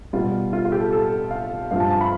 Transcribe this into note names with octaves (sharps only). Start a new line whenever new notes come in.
B2 G3 F4
F4
F4
G4
A4
A4
F5
G2 F3 F5
A5
A5
B5